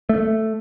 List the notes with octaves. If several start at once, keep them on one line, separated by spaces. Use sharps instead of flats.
A3